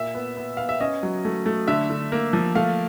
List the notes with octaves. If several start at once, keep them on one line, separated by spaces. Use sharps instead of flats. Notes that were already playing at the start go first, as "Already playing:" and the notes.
Already playing: A#2 E5
B3
B3
B3 F5
E5
C#4 D#5
F#3
A3
A3
D3 E5
D3
A#3
F3
A3 F5